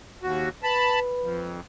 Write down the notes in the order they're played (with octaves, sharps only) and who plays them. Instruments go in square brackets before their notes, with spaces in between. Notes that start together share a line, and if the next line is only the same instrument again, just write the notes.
[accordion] D#2 F#4
[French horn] B4 [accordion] A5 B5
[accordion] F2